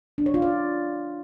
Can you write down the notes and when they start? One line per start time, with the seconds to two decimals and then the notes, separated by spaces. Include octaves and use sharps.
0.18 D4
0.26 C#5
0.34 F4
0.42 D5